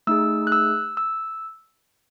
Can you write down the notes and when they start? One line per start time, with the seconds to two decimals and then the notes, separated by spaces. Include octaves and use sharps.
0.07 A3 D#4 G#4 E6
0.47 F#6
0.52 E6
0.97 E6